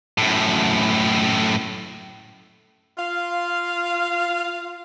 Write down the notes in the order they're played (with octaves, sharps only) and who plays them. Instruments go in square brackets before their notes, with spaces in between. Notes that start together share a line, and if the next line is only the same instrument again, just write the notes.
[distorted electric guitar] F#2 A2
[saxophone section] F4 F5